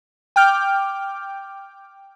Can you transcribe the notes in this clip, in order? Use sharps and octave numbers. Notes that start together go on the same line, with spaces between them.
G5 D6 F6 G6